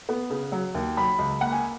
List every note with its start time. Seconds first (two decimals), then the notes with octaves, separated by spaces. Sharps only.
0.09 B3
0.30 C#3
0.52 F#3
0.74 D#2
0.97 F#3 B5
1.19 C#2
1.41 A#3 F#5
1.52 G#5